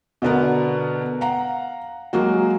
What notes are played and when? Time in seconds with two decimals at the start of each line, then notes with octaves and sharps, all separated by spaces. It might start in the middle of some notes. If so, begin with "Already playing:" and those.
0.22 B2 D3 B3 A#4
1.21 F5 F#5 A#5
2.13 F#3 G#3 A#3 F#4